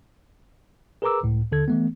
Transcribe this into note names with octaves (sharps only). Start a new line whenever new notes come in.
G#4 A#4 B4 A#5 D6 E6
C#2 A2
D#2 D3 A4 G#6
E3 A3 B3